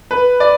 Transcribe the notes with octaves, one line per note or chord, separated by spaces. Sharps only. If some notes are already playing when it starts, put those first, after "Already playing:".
B4
D5